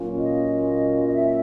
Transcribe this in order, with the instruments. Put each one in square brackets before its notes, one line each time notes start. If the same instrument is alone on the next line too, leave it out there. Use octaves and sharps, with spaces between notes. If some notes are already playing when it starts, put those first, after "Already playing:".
Already playing: [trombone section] A#2 F#3 A#3 C#4 F4
[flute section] D#5
D#5
E5